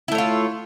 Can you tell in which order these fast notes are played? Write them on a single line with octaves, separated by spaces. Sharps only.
E4 A3 C#5 F4